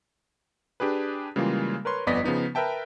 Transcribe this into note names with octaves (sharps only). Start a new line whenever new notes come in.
D4 G4 G#4 B4
C#3 E3 G3 G#3 A#3 F4
A#4 B4 C#5 C6
G1 F2 B3 D5 D#5 B6
C#3 F3 B3 D#4
A#4 B4 E5 G5 A5